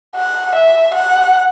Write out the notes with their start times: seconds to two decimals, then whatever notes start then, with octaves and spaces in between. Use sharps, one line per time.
0.15 F#5
0.55 E5
0.94 F#5